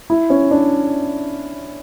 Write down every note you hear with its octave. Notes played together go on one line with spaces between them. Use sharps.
E4
C#4
D4